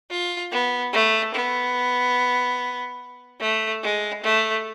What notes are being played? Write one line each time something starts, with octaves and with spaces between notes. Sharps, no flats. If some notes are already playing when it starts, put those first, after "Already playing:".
F4
B3
A3
B3
A3
G#3
A3